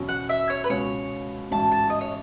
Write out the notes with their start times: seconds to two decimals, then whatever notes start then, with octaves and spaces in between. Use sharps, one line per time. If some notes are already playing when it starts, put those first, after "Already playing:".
Already playing: E2 B2 F#3 C#4
0.09 F#5
0.29 E5
0.50 C#5
0.64 B4
0.70 C#2 B2 G#3 C#4 C#5
1.51 A1 G#2 F#3 C#4 A5
1.72 A5
1.90 D#5
2.01 C#5